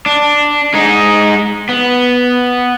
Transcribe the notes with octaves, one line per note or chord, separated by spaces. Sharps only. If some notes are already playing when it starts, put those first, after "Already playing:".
D4
G#3 D#4
B3